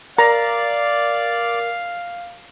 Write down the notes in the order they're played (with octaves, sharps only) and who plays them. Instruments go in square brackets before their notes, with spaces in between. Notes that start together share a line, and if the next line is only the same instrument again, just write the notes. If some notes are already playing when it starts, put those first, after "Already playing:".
[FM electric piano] A#4 [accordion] D5 [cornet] F5 [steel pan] A#5